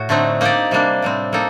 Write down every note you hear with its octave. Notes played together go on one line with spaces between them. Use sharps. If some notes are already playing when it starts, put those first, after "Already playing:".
Already playing: A2 F#4
D3 A3 C4 D#4
A#3 D#4 G4 D5
C3 G3 A#3 D4
A2 G3 C4
A#3 D#4 A4